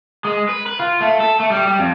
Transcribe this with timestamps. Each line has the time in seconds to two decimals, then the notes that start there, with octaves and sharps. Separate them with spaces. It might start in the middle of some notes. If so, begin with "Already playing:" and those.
0.25 G#3
0.49 B4
0.66 B4
0.79 F4
1.01 A3
1.20 A4
1.40 A3
1.51 G3
1.66 G3
1.79 F2